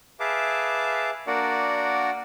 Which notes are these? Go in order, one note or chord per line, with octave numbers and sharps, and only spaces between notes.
G#4 B4 E5 F5 A5 D6
A#3 D4 F#4 A#4 D5 F#5